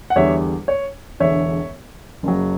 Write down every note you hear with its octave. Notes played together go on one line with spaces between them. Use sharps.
F#5
E2 D3 G3 C#5 E5
C#5
E1 E2 D3 C#5 E5
F#1 F#2 C#3 F#3